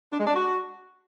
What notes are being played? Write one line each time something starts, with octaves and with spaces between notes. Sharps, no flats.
D4
G#3
D4
F#4